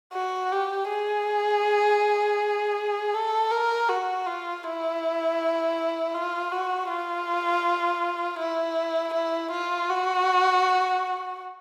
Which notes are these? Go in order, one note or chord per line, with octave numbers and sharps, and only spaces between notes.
F#4
G4
G#4
A4
A#4
F#4
F4
E4
F4
F#4
F4
E4
E4
F4
F#4